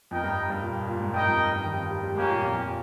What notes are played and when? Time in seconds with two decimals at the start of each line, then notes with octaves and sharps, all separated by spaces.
0.11 F2 D#4 A#4 D#5 G5
0.24 G2
0.50 G2
0.62 A#2
0.88 A#2
1.00 G#2
1.13 G2 D#4 A#4 D#5 G5
1.26 F2
1.51 G2
1.64 D#3
1.72 G3
1.77 F3
1.90 G3
2.03 G3
2.15 G#3 A#3 C#4 G4
2.29 A#2
2.41 F2
2.54 F2